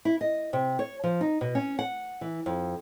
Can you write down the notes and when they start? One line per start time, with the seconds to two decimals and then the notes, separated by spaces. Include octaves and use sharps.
0.05 E4
0.21 D#5
0.53 C3
0.79 C#5
1.04 F3
1.21 D#4
1.41 B2
1.55 C#4
1.79 F#5
2.21 E3
2.46 F2